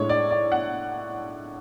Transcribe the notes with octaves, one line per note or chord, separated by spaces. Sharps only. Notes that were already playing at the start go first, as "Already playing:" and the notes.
Already playing: A2 G#3 D4 C#5
D5
D5
F#5